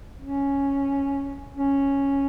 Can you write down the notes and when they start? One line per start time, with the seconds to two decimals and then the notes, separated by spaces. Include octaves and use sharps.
0.21 C#4
1.57 C#4